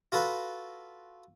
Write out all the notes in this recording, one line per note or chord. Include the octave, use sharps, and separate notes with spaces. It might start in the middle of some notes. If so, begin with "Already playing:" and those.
F4 F#4 A4 B4